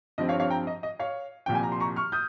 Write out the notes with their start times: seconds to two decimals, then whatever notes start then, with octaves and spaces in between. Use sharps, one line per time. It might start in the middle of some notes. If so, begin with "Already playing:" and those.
0.18 G2 F3 C4 D#5
0.29 C#5 F5
0.40 C#5 F5
0.50 G5 A#5
0.67 D#5
0.83 D#5
0.99 C#5 F5
1.46 C2 A#2 F3 G5
1.55 G#5
1.63 A#5
1.72 C6
1.80 A#5 C#6
1.96 C#6 F6
2.12 D#6 G6